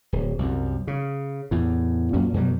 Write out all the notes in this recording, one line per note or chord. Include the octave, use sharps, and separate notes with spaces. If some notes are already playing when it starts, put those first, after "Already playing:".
D1
C2 F#2
C#3
E2 A2
F#2 A#2 F#3 C#4
F#2 B2 F#3 G3